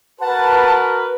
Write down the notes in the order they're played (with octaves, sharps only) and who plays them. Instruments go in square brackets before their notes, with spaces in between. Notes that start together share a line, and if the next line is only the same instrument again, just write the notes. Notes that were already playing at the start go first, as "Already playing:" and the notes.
[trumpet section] F#4 A#4 B4 [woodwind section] F#5 A5